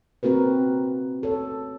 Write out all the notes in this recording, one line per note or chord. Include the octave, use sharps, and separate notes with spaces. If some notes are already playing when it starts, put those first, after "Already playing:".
A#3 C4 F#4 A#4 B4
A4 C#5